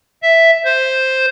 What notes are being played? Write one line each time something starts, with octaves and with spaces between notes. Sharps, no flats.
E5
C5